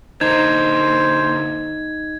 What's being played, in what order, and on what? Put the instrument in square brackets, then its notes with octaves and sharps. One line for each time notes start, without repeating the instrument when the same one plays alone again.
[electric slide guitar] D3 A#3 [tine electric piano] D#4 [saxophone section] C5 [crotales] G#6